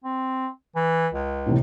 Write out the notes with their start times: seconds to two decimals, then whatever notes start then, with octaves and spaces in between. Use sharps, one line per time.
0.04 C4
0.75 E3
1.13 C#2
1.46 A2 C3 E3